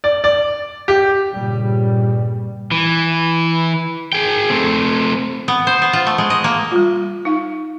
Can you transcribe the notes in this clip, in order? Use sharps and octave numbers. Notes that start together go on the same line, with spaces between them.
D5
D5
G4
G2 A#2 C#3 G3
E3
G#4 G5
A3 C4
B3
C5
B3
F4
A3
G#3
D#5
A#3
G3 F4
D#4 F5